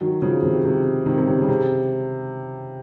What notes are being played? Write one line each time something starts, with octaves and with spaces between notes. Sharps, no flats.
D#3 F#3
C#3 F3
C3 D#3
C3
C3 D#3
C3
C#3
C#3
C3